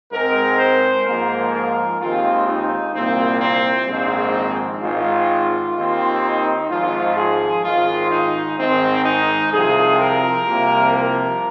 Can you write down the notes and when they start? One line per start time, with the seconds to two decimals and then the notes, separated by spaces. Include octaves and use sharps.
0.12 G#2 G#3 C4 A#4
0.59 C5
1.07 G#2 F3 A#3 A#4
1.54 A#4
2.01 D#2 D#3 G#3 C4 F4
2.47 D#4
2.95 C2 A#2 A#3 C4
3.41 C4
3.88 A#1 G#2 D#3 G#3 C4
4.82 G#1 G#2 D#3 G#3 F4
5.77 D#2 D#3 C4
6.23 D#4
6.70 G#1 G#2 F3 F4
7.17 G#4
7.64 G#1 G#2 D#3 G#3 F4
8.11 D#4
8.59 G#1 G#2 D#3 G#3 C4
9.06 D#4
9.53 C2 C3 F3 C4 G#4
9.99 A#4
10.46 C2 C3 F3 A#3
10.93 A#4